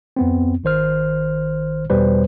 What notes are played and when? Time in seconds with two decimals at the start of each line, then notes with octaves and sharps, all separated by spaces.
0.16 F2 B3 C4
0.64 G#1 D#3 C5 F6
1.90 E2 B2 G3 B4 C5